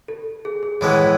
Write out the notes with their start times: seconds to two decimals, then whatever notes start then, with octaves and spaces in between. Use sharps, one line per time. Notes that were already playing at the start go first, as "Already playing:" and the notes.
0.08 A4
0.45 G#4
0.63 G#4
0.81 A2 E3 G#3 B3 G#4